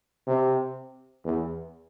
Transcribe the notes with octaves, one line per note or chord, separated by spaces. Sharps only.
C3
E2